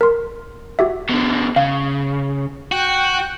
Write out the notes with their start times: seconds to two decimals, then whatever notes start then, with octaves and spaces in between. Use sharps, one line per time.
0.01 A#4 C6
0.79 F#4 G4 E5
1.09 B2 D3
1.56 C#3 F5
2.72 F#4 G5 F#6